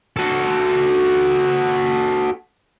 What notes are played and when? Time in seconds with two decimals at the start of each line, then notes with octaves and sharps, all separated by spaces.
0.17 F#4 A4